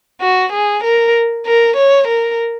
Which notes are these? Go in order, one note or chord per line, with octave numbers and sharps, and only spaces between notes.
F#4
G#4
A#4
A#4
C#5
A#4